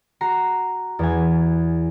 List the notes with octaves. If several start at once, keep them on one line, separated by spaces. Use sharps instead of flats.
F#4 A#5 C7
E2 G#5